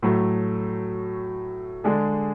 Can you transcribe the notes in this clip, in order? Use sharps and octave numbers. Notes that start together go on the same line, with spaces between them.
A2 F#3 A3
D3 G#3 D4 G#4